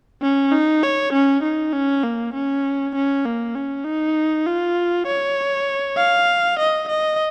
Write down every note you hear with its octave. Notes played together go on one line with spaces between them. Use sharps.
C#4
D#4
C#5
C#4
D#4
C#4
A#3
C#4
C#4
A#3
C#4
D#4
F4
C#5
F5
D#5
D#5